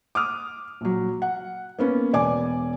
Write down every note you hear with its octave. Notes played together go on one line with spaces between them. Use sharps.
D6 D#6 F6
A#1 F#3
F#5
A#3 B3 C#4
E1 D5 G#5 D6